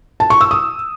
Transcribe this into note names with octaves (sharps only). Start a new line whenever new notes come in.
A5
C#6
E6
D#6